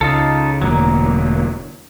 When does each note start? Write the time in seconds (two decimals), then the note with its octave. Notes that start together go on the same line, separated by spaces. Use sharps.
0.01 C#2 D#4 F4 A4
0.62 E1 A2 D3 F#3 A#3